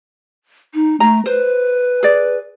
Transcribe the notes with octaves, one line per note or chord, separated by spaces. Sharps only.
D#4
A3 A#5
B4 C5
G#4 D5